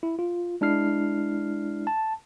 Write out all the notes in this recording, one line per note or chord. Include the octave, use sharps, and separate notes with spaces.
E4
F4
G#3 D4 E4 F6 C7
A5